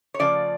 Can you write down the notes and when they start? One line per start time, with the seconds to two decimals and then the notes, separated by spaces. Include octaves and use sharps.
0.14 C#5
0.19 C#3 F3 A3 D5